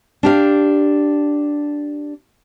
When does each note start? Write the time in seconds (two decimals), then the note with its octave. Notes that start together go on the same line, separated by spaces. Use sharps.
0.23 D4 G4 F5